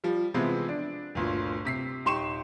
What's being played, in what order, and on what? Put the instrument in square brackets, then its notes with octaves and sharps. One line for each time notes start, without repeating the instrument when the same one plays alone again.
[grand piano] F3 G3
C3 E3 F3 G#3 B3 C4
D4
G1 D2 A#2
C3 B6 C7
D#1 D#4 G4 C6 C#6 E7